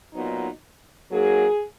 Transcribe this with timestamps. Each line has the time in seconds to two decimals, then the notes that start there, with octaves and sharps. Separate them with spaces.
0.14 A#2 F#3 B3 D#4
1.11 G#2 F#3 A#3 G#4